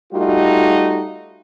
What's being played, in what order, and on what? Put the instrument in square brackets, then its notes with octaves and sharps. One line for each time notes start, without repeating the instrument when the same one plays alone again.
[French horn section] G3 A3 D#4 F4 F#4